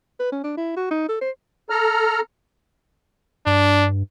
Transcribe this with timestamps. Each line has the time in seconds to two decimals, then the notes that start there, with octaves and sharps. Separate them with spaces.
0.20 B4
0.32 C#4
0.44 D4
0.57 E4
0.77 F#4
0.91 D#4
1.09 A4
1.21 C5
1.70 A4 A#5 F6
3.46 G2 D4